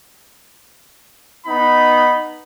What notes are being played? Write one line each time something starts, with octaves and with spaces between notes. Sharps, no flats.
B3 D#4 B5